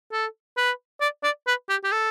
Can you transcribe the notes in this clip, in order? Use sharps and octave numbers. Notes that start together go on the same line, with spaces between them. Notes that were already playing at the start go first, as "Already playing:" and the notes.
A4
B4
D5
D5
B4
G4
G4
A4